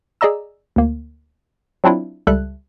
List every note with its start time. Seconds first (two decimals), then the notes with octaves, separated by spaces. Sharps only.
0.21 G#4 D5 D#5 A#5 E6
0.76 D2 A#3
1.84 F#3 C4 D4 E4 F4
2.27 C#2 G3 A4 E5 F#6